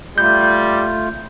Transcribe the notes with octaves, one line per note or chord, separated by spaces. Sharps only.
G3 A3 F4 G6